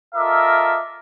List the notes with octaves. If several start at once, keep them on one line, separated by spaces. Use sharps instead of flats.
F4 A4 A#4 D#5 E5 D6